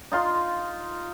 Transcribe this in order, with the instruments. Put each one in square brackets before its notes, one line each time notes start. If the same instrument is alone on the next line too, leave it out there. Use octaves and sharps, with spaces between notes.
[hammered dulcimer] D#4 F4 C6